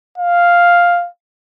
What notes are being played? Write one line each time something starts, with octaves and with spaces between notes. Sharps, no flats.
F5